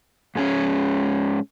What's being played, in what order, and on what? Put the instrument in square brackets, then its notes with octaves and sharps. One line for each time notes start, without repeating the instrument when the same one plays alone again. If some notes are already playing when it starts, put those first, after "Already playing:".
[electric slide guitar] G#2 G#3 C#4